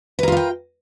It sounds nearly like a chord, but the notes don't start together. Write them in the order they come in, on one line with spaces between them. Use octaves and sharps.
B4 A#4 F4 F5 G5